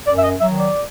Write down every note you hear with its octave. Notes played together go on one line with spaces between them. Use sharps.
F#2 D5
E5
D#5
D#3 F#3 E5
D5